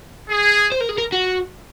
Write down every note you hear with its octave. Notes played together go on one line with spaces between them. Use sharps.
G#4
C5
A#4
G#4
A#4
F#4